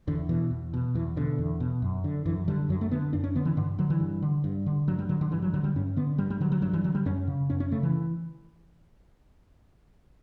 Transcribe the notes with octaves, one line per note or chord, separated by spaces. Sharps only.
E2 D3
B2 E3
E2
B2
E2 E3
B2 D3
E2
B2
F#2
D3
F#2 E3
D3 G3
F#2 F#3
A3
D3 B3
F#2 D4
C#4
D3 B3
E3
G2 D3
D3 F#3
E3
G2
D3
G2
D3
G2 F#3
G3
D3 F#3
D3
G2 E3
F#3
D3 F#3
G3
G2 C#4
D3 B3
G2 G3
G3
D3 F#3
F#3
G2 F#3
E3
D3 F#3
G3
F#2 C#4
C#3
F#2 C#4
C#4
C#3 A3
E3